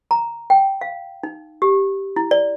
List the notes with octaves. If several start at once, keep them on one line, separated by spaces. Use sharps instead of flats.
A#5
G5
F5
D#4
G4
E4
D5